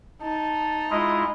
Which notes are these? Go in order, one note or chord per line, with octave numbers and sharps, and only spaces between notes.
D#4 A5
G#3 E4 F4 D#5